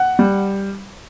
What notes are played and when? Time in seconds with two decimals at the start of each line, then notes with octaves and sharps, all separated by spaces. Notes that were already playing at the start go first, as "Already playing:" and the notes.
Already playing: F#5
0.19 G3